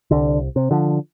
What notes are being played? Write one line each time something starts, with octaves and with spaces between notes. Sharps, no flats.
C2 D3
C3
D3 F3